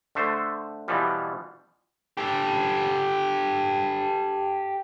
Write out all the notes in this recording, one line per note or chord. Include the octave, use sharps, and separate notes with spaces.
D3 A3 C5
B2 E3 F3 G3
G4 A4